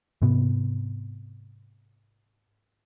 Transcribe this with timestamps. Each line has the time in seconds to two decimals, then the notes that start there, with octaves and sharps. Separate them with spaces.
0.22 G#2 C3 B3